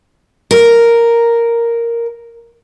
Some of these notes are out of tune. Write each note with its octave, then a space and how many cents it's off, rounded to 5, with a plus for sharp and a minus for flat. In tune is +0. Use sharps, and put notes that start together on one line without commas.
A#4 +0